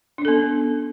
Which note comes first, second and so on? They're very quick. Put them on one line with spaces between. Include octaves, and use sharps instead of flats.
D4 C#4 A4 B3